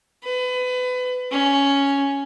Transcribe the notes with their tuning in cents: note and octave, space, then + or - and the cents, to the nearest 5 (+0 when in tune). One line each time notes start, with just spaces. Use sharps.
B4 +30
C#4 +5